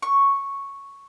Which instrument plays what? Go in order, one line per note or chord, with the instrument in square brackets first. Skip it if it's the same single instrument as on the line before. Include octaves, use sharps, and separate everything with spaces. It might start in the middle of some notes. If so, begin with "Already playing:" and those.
[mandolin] C#6